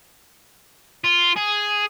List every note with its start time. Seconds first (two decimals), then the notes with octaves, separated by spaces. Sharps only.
1.04 F4
1.36 G#4